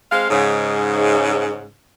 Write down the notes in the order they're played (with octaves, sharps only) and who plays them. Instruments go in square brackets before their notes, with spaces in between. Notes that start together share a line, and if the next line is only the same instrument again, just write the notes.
[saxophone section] G#3 C4 F5
G#2 C#3